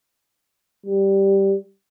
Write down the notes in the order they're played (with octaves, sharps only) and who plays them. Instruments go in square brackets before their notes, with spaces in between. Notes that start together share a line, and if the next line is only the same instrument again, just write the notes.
[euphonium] G3